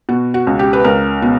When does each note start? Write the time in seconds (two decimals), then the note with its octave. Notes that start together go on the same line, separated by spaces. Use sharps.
0.09 B2 F#4
0.34 F#4
0.47 C#2
0.59 G4
0.73 B4
0.84 C#2 A#4
1.22 B2